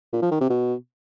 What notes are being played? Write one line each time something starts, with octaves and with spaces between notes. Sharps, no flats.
A#2
F3
D#3
C3
B2